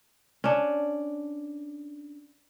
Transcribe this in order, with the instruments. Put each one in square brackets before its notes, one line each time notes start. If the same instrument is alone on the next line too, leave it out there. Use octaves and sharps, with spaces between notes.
[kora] C#4 D4